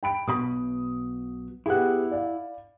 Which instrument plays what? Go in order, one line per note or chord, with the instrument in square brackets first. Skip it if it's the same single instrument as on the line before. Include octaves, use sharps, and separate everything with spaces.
[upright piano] G5 B5 D7
[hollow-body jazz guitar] B1 B2 B5 [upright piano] D#6
[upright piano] B3 G4 G#4 [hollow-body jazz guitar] E4 F#5
[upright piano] D5 F5